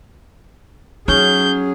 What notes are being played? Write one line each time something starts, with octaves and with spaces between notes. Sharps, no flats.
F#3 C#4 D#4 G#4 G6